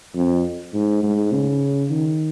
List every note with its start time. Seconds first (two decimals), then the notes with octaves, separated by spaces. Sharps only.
0.15 F2
0.74 G#2
1.03 G#2
1.32 C#3
1.90 D#3